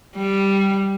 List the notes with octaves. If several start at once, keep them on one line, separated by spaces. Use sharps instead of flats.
G3